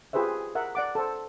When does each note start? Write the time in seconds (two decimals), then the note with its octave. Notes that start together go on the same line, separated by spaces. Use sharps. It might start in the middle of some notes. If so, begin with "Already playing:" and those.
0.13 F4 G4 G#4 B4 C5 E5
0.55 A#4 E5 F#5
0.75 D5 F#5 D6
0.95 A4 C5